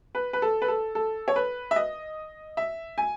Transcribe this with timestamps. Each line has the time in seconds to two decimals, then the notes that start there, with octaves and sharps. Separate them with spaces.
0.15 B4
0.33 B4
0.42 A4
0.62 B4
0.68 A4
0.95 A4
1.28 C#5
1.36 B4
1.71 E5
1.76 D#5
2.57 E5
2.98 G#5